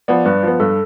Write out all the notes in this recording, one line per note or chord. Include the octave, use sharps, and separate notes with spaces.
F3 B3 D5
G2 B4
F3 B3
G2 A4